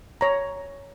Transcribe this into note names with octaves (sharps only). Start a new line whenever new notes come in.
C#5 A#5